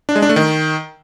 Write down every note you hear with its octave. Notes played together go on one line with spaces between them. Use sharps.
D4
G#3
D4
A3
D#3